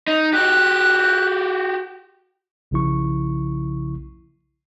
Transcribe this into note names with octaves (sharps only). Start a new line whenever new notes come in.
D#4
F#4 G4 F#6
B1 C#3 F3 E4 C#6